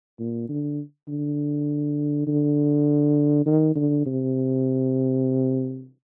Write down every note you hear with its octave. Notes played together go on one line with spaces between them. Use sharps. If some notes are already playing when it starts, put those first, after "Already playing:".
A#2
D3
D3
D3
D#3
D3
C3